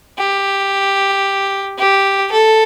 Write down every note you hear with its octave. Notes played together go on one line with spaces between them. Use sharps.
G4
G4
A4